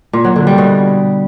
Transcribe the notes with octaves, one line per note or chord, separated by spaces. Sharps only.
A#2
F#3
D3
G3
B2